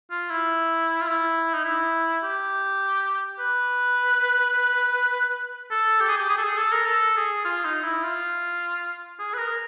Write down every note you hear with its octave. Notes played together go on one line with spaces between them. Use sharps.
F4
E4
F4
E4
D#4
E4
G4
B4
A4
G4
G#4
G4
G#4
A4
G#4
A4
A#4
A4
G#4
F4
D#4
E4
F4
G#4
B4
A#4